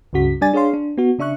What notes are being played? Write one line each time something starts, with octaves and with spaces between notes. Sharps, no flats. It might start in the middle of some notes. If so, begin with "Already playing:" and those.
C#2 G2 C#3 F#4 B6
G3 D4 D5 G#5 A6
D4 G#4 C#5 F5 C6
D4
B3 F#4
C#3 D4 E5 C#6 F#6